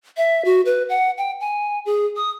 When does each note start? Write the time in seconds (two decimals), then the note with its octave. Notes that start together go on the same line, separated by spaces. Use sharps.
0.17 E5
0.45 F#4
0.65 B4
0.89 F#5
1.18 G5
1.40 G#5
1.86 G#4
2.16 D#6